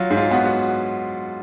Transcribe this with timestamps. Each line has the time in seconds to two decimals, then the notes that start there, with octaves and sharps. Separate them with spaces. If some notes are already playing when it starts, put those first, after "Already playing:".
Already playing: F#3 F4
0.10 G#2
0.17 F4
0.31 B3 F#4
0.46 F#4